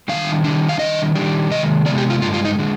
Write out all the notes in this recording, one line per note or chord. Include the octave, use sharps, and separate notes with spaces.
D#3 G3 D4 F5
D#3 G3 D4
F5
D#3 G3 D4 D#5
D#3 G3 D4
C3 D#3 G#3 D#5
C3 D#3 G#3 B3 D5
G4
F4
G2 D3 G#3 F4
F4
D#4
D3 G#3